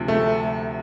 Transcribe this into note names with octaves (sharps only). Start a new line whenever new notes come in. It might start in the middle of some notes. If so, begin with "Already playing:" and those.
Already playing: D2 C3 F3
A3